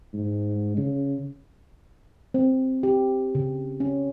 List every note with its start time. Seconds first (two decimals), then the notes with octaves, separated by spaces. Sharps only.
0.13 G#2
0.77 C#3
2.34 C4
2.83 G4
3.35 C#3
3.80 C#4